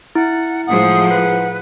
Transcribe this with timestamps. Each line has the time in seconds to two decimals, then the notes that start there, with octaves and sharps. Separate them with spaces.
0.15 E4 F#5
0.67 A2 F3 G#3 F#5 D#6
1.10 B4